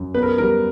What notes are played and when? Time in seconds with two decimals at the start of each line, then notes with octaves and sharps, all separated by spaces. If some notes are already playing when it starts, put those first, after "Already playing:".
Already playing: F#2
0.14 B3 B4
0.23 A#4
0.38 G3 A#4